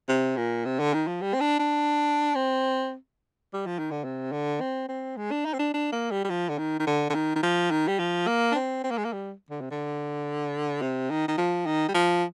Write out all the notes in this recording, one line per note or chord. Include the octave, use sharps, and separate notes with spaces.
C3
A#2
C3
D3
D#3
F3
G3
C4
D4
D4
C4
G3
F3
D#3
D3
C3
D3
C4
C4
G#3
D4
D#4
C4
D4
D4
A#3
G3
G3
F3
D3
D#3
D#3
D3
D3
D#3
D#3
F3
D#3
G3
F3
A#3
D4
C4
C4
A#3
G#3
A#3
G3
D3
C3
D3
C3
D#3
D#3
F3
D#3
G3
F3